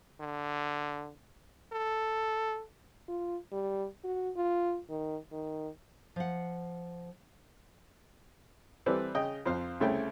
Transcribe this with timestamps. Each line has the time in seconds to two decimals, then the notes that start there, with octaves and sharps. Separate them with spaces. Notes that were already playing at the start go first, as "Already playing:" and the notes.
0.20 D3
1.72 A4
3.09 F4
3.52 G3
4.04 F#4
4.36 F4
4.90 D#3
5.32 D#3
6.16 F3 F#5
8.86 E3 G3 C4 A4 B4 D5
9.15 C#3 D#5 G5
9.46 F2 C5 F5
9.80 C2 C#3 A3 C#4 G5